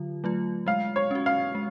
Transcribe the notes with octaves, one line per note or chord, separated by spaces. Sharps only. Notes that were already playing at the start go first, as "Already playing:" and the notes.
Already playing: D3 F#3 F4
F#3 A3 F4
G#3 F5
C#5
C#4 F#4
F5
G#3